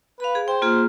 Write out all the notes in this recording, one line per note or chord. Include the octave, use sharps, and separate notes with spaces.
B4 F5 B5
G#4
C5 G5
A#3 F4 G#4